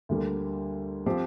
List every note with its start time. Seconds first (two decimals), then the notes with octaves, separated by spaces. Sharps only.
0.09 D2 D3 G3 A#3
1.06 F3 C4 G4 C5